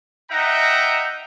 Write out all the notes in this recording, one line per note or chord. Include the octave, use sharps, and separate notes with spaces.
D#4 E5 F#5 G5 A#5